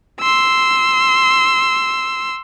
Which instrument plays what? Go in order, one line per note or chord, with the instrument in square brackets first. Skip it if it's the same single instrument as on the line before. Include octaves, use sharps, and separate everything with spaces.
[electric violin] C6 E6